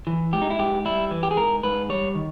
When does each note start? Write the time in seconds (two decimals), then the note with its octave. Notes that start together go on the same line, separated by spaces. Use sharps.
0.07 E3
0.33 G#2 G4
0.42 D#4
0.50 E4
0.59 G#2 G4
0.85 G3 E4
1.11 E3
1.23 G4
1.31 G#4
1.37 G#2 A#4
1.63 G#2 B4
1.89 G3 C#5
2.15 D#3